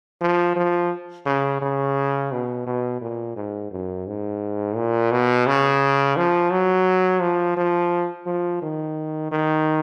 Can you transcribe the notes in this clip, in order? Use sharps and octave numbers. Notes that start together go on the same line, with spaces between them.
F3
F3
C#3
C#3
B2
B2
A#2
G#2
F#2
G#2
A#2
B2
C#3
F3
F#3
F3
F3
F3
D#3
D#3